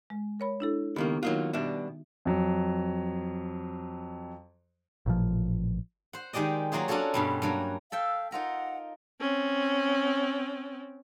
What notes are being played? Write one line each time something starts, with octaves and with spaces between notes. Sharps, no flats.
G#3
A#4 C#5 B5
D4 E4 A4
C#2 D#3 A#3 B3 G4
D#3 F#3 A#3 D#4 F4 F#4
B2 G3 D4 E5
F2 F#3
A1 A#2 F3
C5 F#5
D#3 G#3 G4 D5 D#5
F#3 A#3 F4 F#4 G#4
C#4 D4 F4 F#4 A4 C#5
G2 B2 G3
G2 F#3 A#3
A4 E5 F5 G5
D#4 F4 A#4 F#5
C4 C#4